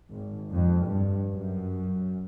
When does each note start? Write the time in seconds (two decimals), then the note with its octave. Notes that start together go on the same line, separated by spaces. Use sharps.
0.12 G#1
0.51 F2
0.85 G2
1.33 F#2